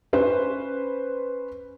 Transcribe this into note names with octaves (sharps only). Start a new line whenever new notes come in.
C#4 B4 C5